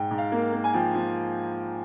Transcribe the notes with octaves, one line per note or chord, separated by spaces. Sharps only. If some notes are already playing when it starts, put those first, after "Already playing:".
Already playing: G#2 G5
G#2
F5
A#3
A#3
G#5
F3 G5
F3